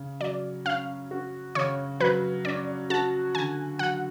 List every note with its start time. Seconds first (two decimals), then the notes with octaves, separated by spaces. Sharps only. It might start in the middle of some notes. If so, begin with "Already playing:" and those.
Already playing: C#3
0.20 F#3 D5
0.65 C#4 F5
1.11 F#4
1.55 C#3 C#5
2.00 F#3 B4
2.45 C#4 D5
2.90 F#4 A5
3.35 D3 G#5
3.79 F#3 F#5